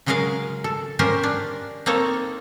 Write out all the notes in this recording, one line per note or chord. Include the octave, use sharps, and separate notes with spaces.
C#3 F#3 G#3 G#4 A#4 F5
A4
C#4 F4 G4 A#4 C5
D4
A#3 C4 D#4 A4 C#5